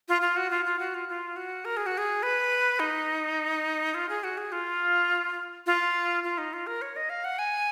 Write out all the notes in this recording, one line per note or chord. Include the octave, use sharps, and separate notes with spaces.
F4
F4
F#4
F4
F4
F#4
F4
F4
F#4
A#4
G#4
F#4
G#4
B4
D#4
F4
G#4
F#4
G#4
F4
F4
F4
D#4
F4
A#4
C#5
D#5
F5
F#5
G#5